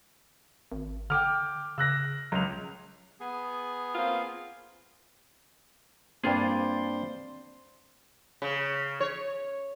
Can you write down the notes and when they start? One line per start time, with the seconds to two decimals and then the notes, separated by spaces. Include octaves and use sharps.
0.72 G#1
1.10 D3 G5 D6 F6
1.78 C#3 E6 F#6 A#6
2.32 C#2 F#3 F7
3.20 B3 G#4
3.95 A#3 C4 F4
6.24 G2 A#3 C4 D4 F4 G#4 C5 D5
8.42 C#3
9.00 C#5